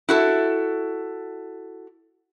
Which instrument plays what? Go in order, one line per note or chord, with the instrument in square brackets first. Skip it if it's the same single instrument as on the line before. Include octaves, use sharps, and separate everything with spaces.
[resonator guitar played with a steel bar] E4 F#4 A4